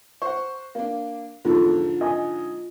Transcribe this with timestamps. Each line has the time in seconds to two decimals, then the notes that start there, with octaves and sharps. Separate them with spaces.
0.22 C5 F#5 C#6
0.75 A#3 D4 F5
1.45 E2 G#2 D3 F3 F4 A4
2.01 D#5 G#5 D#6